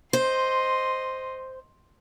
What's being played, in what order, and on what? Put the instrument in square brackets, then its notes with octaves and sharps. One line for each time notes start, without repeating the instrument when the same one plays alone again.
[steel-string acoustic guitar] C5 [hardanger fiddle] D#5 C6